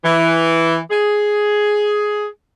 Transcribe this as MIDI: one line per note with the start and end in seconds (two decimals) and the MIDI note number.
0.04 0.78 52
0.91 2.27 68